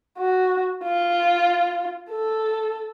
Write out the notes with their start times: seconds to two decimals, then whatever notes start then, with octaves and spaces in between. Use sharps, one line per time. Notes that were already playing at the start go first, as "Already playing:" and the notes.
0.18 F#4
0.84 F4
2.10 A4